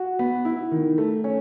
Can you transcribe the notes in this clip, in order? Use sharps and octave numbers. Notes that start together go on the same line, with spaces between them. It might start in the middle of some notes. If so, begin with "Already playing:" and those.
Already playing: F#4
B3
E4
D#3
A3
C#4